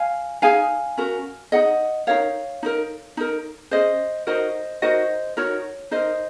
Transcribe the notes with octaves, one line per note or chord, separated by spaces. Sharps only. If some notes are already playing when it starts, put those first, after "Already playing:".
Already playing: F5 G#5
D#4 G#4 F5 G#5
C#4 F#4 A#4
D#4 G#4 D#5 F#5
D#4 F#4 A#4 C#5 F5
D#4 F#4 A#4
D#4 A#4
C#4 G#4 C5 D#5
D#4 F#4 A#4 C5 D#5
D#4 F#4 A#4 C5 D#5
D#4 F#4 A#4 C#5
D#4 A#4 C5 D#5